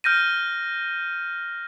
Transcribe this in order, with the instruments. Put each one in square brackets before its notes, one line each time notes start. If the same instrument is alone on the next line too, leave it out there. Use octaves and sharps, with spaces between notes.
[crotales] F6 G6 A#6 D#7